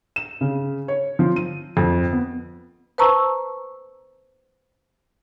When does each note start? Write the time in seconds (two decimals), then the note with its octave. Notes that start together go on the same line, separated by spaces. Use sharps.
0.16 E7
0.41 C#3
0.88 C#5
1.19 F3
1.36 D#7
1.77 F2
2.13 B3
2.98 B4 C5 A5 A#5 C#6 E6